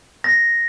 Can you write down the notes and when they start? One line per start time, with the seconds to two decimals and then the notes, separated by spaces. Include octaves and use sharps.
0.24 A#6